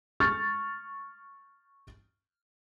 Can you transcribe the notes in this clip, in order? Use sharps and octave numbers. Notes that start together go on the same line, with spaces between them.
C#6 F6 A6